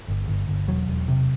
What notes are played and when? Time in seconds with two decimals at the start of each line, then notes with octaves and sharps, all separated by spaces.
0.08 G1
0.28 G1
0.48 G1
0.68 E1 F#3
0.88 E1
1.08 C3